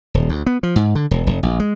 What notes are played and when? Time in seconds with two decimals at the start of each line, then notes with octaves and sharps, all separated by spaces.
0.14 D#1
0.29 D2
0.46 B3
0.63 F3
0.76 G#2
0.95 D3
1.11 E1
1.27 F1
1.43 A#1
1.60 G#3